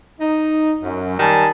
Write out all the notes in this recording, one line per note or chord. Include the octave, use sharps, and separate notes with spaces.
D#4
F#2
D#3 G3 G#5 A5